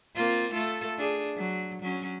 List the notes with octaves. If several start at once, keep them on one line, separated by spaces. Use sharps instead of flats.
A#3 C4 F4
A3 F4 A4
D4 G#4
F#3
F#3 C#4